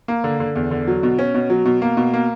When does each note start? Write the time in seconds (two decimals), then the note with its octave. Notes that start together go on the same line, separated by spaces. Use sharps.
0.08 A#3
0.24 D3
0.40 D3
0.56 E2
0.71 D3
0.88 F#3
1.03 B2
1.19 C#4
1.34 B2
1.50 F#3
1.65 B2
1.82 A#3
1.97 B2
2.14 A#3